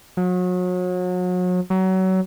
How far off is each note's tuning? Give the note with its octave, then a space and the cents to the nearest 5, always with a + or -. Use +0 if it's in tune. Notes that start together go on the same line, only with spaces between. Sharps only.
F#3 -35
F#3 +25